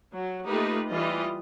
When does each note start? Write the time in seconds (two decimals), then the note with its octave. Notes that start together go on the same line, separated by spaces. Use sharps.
0.14 F#3
0.46 A3 A#3 D#4 F4 G4 B4
0.89 E3 G3 F4 D#5